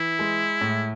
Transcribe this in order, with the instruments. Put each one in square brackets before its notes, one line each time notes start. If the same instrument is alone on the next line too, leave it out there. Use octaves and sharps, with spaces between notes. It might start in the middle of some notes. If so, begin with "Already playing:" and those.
Already playing: [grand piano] E3 [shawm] E4
[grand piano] G#3
A2